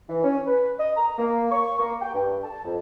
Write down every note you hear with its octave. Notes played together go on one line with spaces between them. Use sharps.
E3
C#4
B4
D#5
A#5
A#3
C#6
A#3
G5
G2
A5
F2